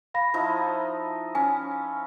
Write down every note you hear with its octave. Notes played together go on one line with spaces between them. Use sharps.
F5 B5 A#6
F3 D#4 E4
C#4 G#5